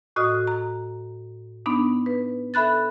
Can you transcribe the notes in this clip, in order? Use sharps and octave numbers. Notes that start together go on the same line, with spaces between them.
A2 F#4 D#5 D#6 F6
A#5
B3 D4 D#4
B4
A4 E5 B5 F#6 A6